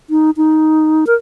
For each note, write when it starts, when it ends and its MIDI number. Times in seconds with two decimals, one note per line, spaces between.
0.10 0.31 63
0.37 1.05 63
1.07 1.14 70